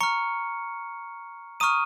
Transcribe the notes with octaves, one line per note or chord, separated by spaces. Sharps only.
A#5 C#6 F6 C#7
A#5 C#6 D#6 F6 D#7